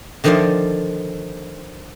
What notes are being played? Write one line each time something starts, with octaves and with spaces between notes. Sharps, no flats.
D3 D#3 F3 F4 C5 D5